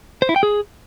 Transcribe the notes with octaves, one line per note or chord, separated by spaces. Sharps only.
C5
E4
G5
G#4